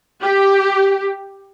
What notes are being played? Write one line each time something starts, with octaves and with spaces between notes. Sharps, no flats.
G4